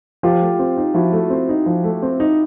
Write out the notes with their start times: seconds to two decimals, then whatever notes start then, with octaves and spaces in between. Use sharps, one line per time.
0.23 F3 F4 G4
0.41 A3
0.59 C4
0.77 D#4
0.94 F3 E4 F#4
1.12 A3
1.30 C4
1.49 D#4
1.66 F3
1.84 A3
2.02 C4
2.20 D#4